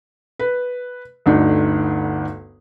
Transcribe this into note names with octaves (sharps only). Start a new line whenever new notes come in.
B4
G1 D2 D4 D#4